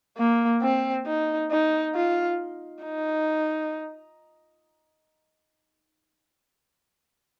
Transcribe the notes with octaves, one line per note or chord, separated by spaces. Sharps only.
A#3
C4
D#4
D#4
F4
D#4